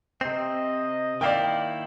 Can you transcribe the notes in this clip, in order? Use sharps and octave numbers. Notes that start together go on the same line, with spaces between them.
C3 C4 D#5
D#3 A#3 E4 D5 F5 G5